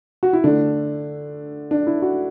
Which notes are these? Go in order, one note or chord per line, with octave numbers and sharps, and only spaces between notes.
F#4
E4
D3 A3 D4
D4
E4
F#4